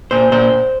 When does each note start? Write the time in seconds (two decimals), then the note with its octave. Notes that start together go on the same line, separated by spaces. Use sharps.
0.11 A#2 C5
0.32 A#2 C5